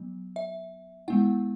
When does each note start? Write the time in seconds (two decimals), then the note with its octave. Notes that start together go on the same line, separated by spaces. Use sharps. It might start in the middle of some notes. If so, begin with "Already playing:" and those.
Already playing: F#3 B3
0.36 E5
1.08 G#3 B3 E4 F#5